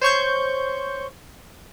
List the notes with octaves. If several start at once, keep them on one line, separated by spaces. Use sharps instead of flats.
C5 C#5 C#6 G6